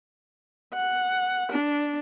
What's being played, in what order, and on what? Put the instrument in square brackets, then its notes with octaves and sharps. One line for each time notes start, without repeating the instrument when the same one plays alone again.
[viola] F#5
D4